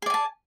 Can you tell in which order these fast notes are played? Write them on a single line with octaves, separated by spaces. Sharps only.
G#4 D5 G#5 A5